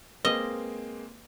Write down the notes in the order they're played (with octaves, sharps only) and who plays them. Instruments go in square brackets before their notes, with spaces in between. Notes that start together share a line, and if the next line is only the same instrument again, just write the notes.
[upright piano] G#3 A#3 C4 [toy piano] B4 [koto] D#5